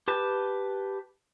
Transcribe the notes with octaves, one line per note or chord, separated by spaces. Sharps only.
G4 B4 A5